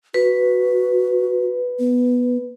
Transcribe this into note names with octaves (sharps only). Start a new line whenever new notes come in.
F#4 B4
B3